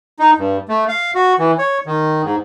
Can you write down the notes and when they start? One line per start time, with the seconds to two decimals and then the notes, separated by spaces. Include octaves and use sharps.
0.19 D#4
0.39 G2
0.68 A3
0.88 F5
1.15 F#4
1.39 E3
1.58 C#5
1.86 D#3
2.24 G#2